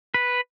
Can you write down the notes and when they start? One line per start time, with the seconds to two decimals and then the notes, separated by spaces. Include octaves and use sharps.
0.14 B4